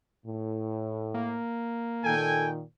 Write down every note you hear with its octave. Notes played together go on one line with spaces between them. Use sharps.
A2
A#3
A#2 D#3 A4 G5 G#5